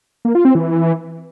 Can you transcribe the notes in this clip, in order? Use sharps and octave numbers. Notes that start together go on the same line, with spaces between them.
A#3
F4
C4
E3